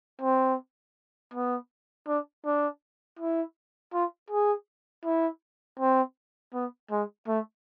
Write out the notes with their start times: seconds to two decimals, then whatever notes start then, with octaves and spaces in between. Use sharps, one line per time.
0.21 C4
1.34 B3
2.07 D4
2.45 D4
3.19 E4
3.93 F4
4.30 G#4
5.05 E4
5.79 C4
6.54 B3
6.91 G#3
7.28 A3